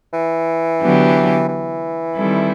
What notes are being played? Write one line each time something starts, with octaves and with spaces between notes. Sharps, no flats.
E3
D3 F#3 B3 D4 G4
E3
D#3 G3 C4 E4 A4